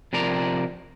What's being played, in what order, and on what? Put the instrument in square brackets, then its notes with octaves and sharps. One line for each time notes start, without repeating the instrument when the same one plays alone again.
[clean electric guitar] C3 F3 A#4 D5 A#5